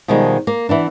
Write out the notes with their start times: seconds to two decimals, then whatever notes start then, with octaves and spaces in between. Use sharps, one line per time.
0.08 B2 D#3 F3 G3 G#3
0.47 A#3
0.69 E3 B3 D4